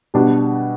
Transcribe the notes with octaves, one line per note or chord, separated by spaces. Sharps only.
B2 G3 D4